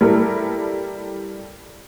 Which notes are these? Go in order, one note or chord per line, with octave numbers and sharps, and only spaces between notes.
G3 E4 A4 A#4